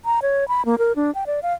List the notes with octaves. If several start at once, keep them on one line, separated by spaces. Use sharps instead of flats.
A#5
C#5
B5
A#3
A#4
D4
G5
D5
F5